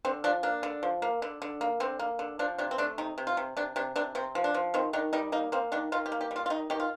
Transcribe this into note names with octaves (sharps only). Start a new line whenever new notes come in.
D3 C4
F3 D4
A#3 D4
D3
F3
A#3
D3
D3
A#3
D3 C4
A#3
D3
F3 D4
C3 D4
C4
A3 D4
C3 D#4
C3
F4
C3
C3 D4
C3 D4
C3 D4
C3 C4
F3
D4
F3
D#3 C4
D#3 D4
G3 D#4
A#3 D#4
A#3 C4
D#3 D4
D#3 F4
G4
A#3
G4
G3
F4
F4
D#3 D#4
D#3 G4
F4